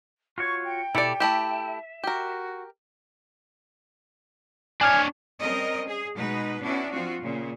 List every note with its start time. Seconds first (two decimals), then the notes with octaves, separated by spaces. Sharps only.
0.38 F4 F#4 C#5 C#6
0.64 G5
0.95 B2 E4 G4 A4 D5
1.20 A3 E4 G4 E5
2.04 F#4 G4 A#4
4.81 D4 C#5 G#5 F6 G#6
5.40 G3 C4 C#4 A#4 D#5
5.87 G#4
6.16 B2 G#3 D#4 B4
6.62 B3 C#4 D4 E4 F#4
6.91 F3 C4 F4 F#4
7.21 A#2 C#3